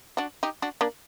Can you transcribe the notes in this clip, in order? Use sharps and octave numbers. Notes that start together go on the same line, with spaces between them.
D4 F#4
D#4 G4
D4 F#4
A#3 D4